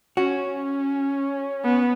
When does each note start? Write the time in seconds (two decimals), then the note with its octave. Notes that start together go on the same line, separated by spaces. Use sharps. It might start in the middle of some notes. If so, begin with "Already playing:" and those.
0.17 C#4 F#4
1.64 B3